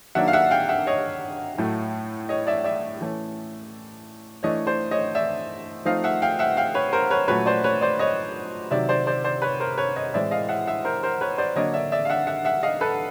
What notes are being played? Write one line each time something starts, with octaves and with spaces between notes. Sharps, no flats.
D#3 F#3 A#3 D4 E5 F#5
F5
E5 F#5
F5 G5
E5 F#5
C#5 D#5
A2 F#3 A3
C#5 D#5
D5 E5
D5 E5
E3 A3 C#4
E3 A3 D4 C#5 D#5
C5 D5
C#5 D#5
D5 E5
F3 A3 C4 D#4 D#5 F5
E5 F#5
F5 G5
E5 F#5
F5 G5
B4 C#5
A#4 C5
B4 C#5
A#2 F#3 A3 C#4 B4 C#5
C5 D5
B4 C#5
C5 D5
C#5 D#5
C3 D#3 F#3 D5 E5
C5 D5
C5 D5
C5 D5
B4 C#5
A#4 C5
B4 C#5
C#5 D#5
A2 E3 G#3 C4 D5 E5
D#5 F5
E5 F#5
E5 F#5
A#4 C5
A#4 C5
B4 C#5
C5 D5
D3 F#3 A#3 D4 C#5 D#5
D5 E5
D5 E5
F5
E5 F#5
E5 F#5
E5 F#5
D#5 F5
A4 B4